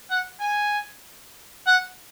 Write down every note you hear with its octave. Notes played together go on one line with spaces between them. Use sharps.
F#5
G#5
F#5